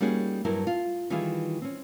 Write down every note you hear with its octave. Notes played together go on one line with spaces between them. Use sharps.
G3 A#3 C#4 D#4 F#4 G#4
G2 F#3 E4 A#4
F4
D#3 E3 G3 E4 F4 G#4
C4 C#4